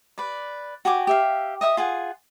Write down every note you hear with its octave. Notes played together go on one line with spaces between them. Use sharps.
B4 D5
F#4 G4 G#5 D6
G4 E5 F5
D#5 E5 G5 D#6
F4 G#4 F#5 G#5